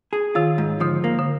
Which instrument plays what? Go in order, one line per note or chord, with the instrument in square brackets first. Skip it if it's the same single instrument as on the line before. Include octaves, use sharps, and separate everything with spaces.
[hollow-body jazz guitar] G#4
[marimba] D#3 [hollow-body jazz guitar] F4
[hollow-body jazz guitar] G#2
[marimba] D3 [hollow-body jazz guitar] F3
[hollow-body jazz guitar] A#3
[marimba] D3